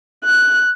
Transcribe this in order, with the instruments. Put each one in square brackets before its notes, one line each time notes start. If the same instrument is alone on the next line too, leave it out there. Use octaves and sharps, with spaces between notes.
[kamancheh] F#6